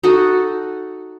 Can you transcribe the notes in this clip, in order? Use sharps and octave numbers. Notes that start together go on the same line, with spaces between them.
D#4 F#4 A4